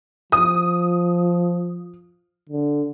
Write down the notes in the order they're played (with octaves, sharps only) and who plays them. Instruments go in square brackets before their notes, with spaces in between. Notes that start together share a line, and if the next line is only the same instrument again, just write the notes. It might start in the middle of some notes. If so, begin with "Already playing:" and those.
[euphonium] F3 [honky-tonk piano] D#6
[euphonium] D3